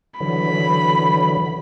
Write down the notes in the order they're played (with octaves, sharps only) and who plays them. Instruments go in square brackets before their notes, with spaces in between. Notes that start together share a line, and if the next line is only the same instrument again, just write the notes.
[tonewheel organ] D3 E3 F#3 [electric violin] B5